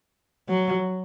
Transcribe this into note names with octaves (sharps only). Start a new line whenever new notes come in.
F#3